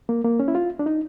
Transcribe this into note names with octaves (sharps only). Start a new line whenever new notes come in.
A#3
A#3
C#4
E4
F4
D4
D#4